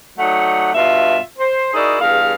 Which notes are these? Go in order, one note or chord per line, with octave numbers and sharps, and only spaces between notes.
F#3 A3 D#4 D5 F#5
G2 B2 F4 E5
C5
D#4 E4 F#4 G#4 A#4 D5
E2 G2 G#4 F5